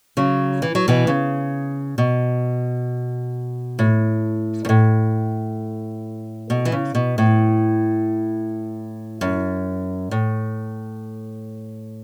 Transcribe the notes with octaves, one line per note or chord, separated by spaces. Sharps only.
C#3 F#3
E3
F#3
B2 E3
C#3
B2
A2
F#2
A2
B2
E3
C#3
B2
A2
F#2
A2